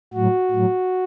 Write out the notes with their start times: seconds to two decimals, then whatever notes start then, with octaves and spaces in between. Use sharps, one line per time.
0.14 A2 F#3 F#4
0.51 A2 F#3